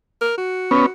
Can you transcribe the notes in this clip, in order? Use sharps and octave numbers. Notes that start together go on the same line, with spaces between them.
A#4
F#4
B3 C#4